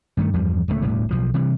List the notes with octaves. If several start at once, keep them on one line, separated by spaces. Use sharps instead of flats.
G2 D#3 A3
E2 G2 F3 G3
D1 C#2 B2 A3
E1 D2 A2 G3
B1 F3
C3 E3 G3